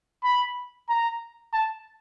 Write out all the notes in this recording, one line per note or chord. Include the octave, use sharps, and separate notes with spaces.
B5
A#5
A5